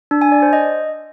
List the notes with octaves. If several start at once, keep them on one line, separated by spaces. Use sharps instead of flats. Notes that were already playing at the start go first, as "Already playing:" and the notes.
D4
G#5
D5
C5
D#5